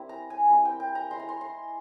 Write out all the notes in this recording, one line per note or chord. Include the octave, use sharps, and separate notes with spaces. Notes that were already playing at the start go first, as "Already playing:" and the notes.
Already playing: G3 A#3 C4 E4
A#5
G#5
G3 C4 E4
G5
G5
A#5
G#3 E4 C6
A#5
C6
C6